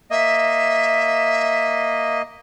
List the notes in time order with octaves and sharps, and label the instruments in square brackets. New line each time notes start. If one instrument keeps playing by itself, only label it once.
[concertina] A#3 D#5 [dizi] E5